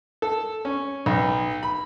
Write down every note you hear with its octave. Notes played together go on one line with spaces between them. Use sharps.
A4
C#4
B1
B5